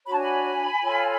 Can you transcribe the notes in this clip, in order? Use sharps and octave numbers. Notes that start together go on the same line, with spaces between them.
D4 F#4 C#5 B5
A5
G#5 B5
F4 A4 C#5